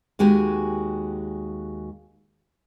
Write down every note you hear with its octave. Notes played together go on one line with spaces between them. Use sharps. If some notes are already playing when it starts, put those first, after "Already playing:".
D#2 G#3 F#4 G4 G#5